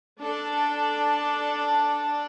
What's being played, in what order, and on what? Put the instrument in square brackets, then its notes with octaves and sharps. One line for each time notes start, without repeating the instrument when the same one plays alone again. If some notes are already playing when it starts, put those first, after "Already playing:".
[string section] D4 A4 D5